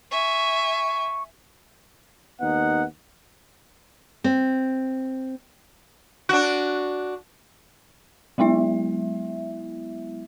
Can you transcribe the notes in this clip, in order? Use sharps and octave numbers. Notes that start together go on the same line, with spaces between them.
E5 G#5 C#6
D#2 B3 D#4 F#5
C4
D4 F#4
F#3 G#3 B3 E4 E5